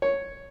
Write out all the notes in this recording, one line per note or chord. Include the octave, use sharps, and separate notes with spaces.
C#5